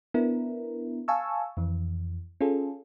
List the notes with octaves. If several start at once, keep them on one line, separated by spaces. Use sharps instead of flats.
B3 D4 E4 A#4
F5 G#5 A5 C#6 E6
F2 E3
C#4 F4 G#4 A4